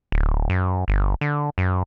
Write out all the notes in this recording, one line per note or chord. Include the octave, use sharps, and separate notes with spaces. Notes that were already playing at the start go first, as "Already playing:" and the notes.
D1
F#2
G1
D3
F#2